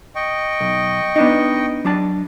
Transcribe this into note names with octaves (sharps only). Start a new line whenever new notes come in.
D#5 G5 C#6
B1
B3 D4 D#4
F#3 D4 A5